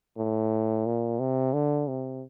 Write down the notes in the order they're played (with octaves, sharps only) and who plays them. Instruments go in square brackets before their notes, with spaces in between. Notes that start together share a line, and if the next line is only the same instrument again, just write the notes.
[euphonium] A2
A#2
C3
D3
C3